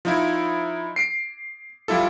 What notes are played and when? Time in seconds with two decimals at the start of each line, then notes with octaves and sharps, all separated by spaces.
0.05 F3 D#4 E4
0.96 C7 D7
1.88 F3 G3 E4 F4 A4